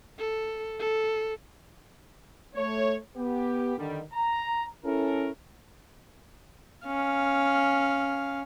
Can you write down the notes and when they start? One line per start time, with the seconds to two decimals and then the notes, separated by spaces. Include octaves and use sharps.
0.19 A4
0.79 A4
2.55 A3 C#5
3.16 B3 G4
3.78 D3 D#3 G3
4.13 A#5
4.85 C#4 E4 A4 A#4
6.86 C#4 F5